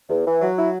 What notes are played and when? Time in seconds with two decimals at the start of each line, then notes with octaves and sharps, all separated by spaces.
0.09 E2
0.26 E3
0.41 F#3
0.57 E4